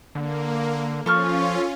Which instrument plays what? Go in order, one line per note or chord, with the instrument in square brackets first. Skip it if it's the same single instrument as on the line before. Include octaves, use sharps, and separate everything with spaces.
[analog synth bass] D3 [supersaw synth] A#3
[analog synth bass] F3 [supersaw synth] C#4 F4 [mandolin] A4 C#6 F6